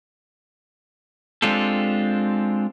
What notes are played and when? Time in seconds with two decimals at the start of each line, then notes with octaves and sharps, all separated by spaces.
1.42 G#3 C4 D4 F4 G4 A4